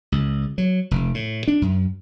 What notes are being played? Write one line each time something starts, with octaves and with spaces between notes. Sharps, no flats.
C#2
F#3
F1
A2
D4
F#2